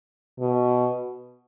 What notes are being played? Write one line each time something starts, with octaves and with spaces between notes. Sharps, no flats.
B2